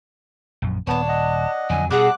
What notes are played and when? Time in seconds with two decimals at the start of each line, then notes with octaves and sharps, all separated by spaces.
0.62 A#1 F#2
0.87 D#1 B3 D4 C#5 A5
1.09 D#5 F#5
1.70 F2 D3 F#3 G#5
1.91 B2 G3 F#4 G#4 A4 D6 F#6